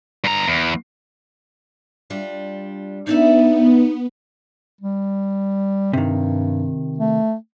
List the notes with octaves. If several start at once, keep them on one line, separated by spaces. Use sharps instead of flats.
G2 A#5
E2
G3 D4 F4
B3 D4 D#4 D5 E5
G3
G2 C3 D#3
A3